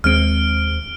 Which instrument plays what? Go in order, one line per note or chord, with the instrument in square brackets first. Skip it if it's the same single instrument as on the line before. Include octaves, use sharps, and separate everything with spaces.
[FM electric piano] D#2 G#3 C4 [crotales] F6 D7